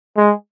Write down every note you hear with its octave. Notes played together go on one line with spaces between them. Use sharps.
G#3